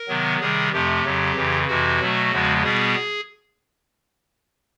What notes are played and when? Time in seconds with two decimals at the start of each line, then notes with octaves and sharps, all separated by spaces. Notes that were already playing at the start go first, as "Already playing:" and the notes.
Already playing: A#4
0.08 C3 D#3 F#3 B3
0.40 C3 D#3 G3 G#4
0.73 F2 C3 F3 A3 G4
1.04 F2 C#3 F#3
1.36 F2 C#3 E3
1.67 F2 C3 E3 F#4
2.00 B2 F#3 A3
2.32 E2 C#3 F3 G#3 B3
2.63 B2 G3 B3 G#4